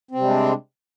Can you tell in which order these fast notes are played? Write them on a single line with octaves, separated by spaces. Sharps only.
C4 C3 G3 G#3 D4